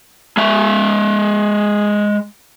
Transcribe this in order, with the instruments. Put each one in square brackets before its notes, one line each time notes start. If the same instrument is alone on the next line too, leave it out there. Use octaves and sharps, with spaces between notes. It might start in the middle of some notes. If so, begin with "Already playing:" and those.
[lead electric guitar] G#3 E5